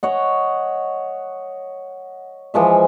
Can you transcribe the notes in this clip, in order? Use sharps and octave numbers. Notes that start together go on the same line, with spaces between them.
C#5 D#5 F#5
E3 F3 G#3 E5